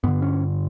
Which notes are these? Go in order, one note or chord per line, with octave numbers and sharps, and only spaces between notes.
G2 D3 B3
C#4